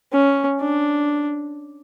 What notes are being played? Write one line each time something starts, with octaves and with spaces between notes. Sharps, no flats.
C#4
D4